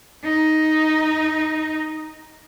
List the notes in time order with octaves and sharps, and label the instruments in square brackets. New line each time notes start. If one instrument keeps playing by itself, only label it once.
[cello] D#4